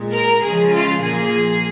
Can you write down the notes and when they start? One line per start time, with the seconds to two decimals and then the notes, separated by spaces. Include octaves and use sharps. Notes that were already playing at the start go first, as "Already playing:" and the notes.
Already playing: A#2 G#3
0.13 A#4
0.43 C#3 F3 G#3 G#4
0.72 F4
1.01 A#2 F3 A#3 G#4